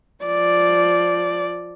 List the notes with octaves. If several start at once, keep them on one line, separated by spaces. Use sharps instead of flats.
F3 D5